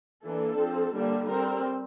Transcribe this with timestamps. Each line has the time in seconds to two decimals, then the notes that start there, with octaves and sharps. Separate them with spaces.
0.23 E3 A#3 D4 A4
0.58 F3 C4
0.93 D3 G3 A#3 D4
1.28 G3 C4 A#4